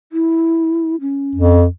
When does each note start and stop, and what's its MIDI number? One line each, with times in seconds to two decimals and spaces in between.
0.12 0.96 64
1.01 1.56 61
1.35 1.65 41